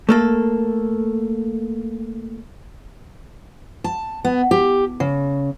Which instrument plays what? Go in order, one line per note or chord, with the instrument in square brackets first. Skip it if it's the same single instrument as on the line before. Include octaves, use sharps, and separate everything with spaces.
[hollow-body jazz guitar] A3 A#3 A4
[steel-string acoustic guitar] A5
B3
G4
C#3